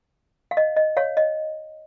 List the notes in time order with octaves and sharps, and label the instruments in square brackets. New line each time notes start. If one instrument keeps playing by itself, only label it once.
[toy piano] F5
D#5
D#5
C#5 F5
D#5